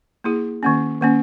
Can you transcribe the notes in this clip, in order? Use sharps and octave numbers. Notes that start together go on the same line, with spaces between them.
A#3 E4 G#4
D#3 A#3 C#4
D#3 A#3 C#4